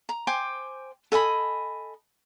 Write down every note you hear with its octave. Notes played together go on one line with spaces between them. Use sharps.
A#5
C5 G5 G#5 D6
A4 D#5 G#5 B5